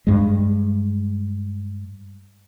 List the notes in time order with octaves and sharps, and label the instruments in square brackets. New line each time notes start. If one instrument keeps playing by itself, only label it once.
[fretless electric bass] G2 G#3